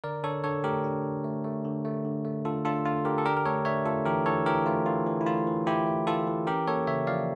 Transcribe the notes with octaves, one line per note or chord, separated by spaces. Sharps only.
D3 A#4 D5
D3 A4 C#5
D3 A4 C#5
A3 G4 A#4
D4
D3
A3
A3
D3
A3
D3
A3
D3 F4 A4
D4 F4 A4
D3 F4
D3 G4 A#4
A4
D4 G4 A#4
A#4
A3 A4 C#5
D4 C#5 E5
A3 F4 A4
E3 G4 A#4
E3 A4 C#5
E3 G4 A#4
A3 F4
E3 F4
E3
E4
A3 F4
E3
E3 E4 G4
A3
E3 F4 A4
E3
C#4 G4 A#4
A#3 A4 C#5
C#3 C#5 E5
F3 D5 F5